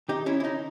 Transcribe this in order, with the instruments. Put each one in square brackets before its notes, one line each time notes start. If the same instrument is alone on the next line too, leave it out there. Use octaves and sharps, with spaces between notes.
[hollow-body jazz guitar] D#3 D#4 G4
C#4 E4
E4
C#4 D#4